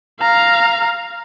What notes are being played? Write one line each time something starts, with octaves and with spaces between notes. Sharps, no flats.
F5 A#5